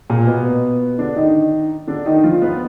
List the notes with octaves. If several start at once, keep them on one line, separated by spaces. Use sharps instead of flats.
A#2 A#3
B2 B3
D3 D4
D#3 D#4
D3 D4
D#3 D#4
F3 F4
B3 B4